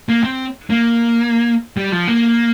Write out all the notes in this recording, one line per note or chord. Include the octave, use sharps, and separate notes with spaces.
A#3
C4
A#3
G3
F3
A#3